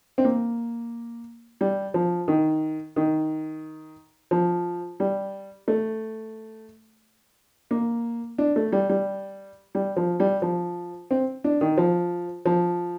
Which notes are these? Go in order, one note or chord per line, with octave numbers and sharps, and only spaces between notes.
C4
A#3
G3
F3
D#3
D#3
F3
G3
A3
A#3
D4
A3
G3
G3
G3
F3
G3
F3
C4
D4
D#3
F3
F3